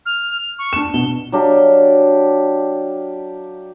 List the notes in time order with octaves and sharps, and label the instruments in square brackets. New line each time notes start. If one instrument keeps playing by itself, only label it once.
[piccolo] F6
C#6
[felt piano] D4 E7
[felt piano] B2 [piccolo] G7
[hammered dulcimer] F#3 D4 G4 F5